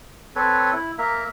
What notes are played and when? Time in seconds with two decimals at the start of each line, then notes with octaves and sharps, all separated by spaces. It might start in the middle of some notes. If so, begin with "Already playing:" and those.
0.36 C4 A4 B4 C#5
0.73 E4
0.98 A#3 A#4 E5